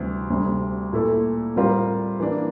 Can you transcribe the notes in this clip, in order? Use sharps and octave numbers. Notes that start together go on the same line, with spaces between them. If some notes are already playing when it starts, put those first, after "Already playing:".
Already playing: D2 C3 E3 G3
D2 C3 G3
A#2 A3 E4 A4
A2 G3 C4 F4 A#4
E3 A#3 D4